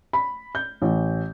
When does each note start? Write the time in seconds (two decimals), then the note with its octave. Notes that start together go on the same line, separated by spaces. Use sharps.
0.13 B5
0.55 G6
0.82 A1